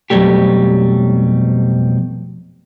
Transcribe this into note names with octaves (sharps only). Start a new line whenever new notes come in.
B1 F2 F#3 G3 A3 G4